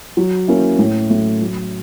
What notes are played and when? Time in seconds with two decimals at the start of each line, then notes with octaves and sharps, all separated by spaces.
0.17 F#3
0.48 A#3 C#4 E4
0.79 A2
1.10 F#3 A3
1.41 F#3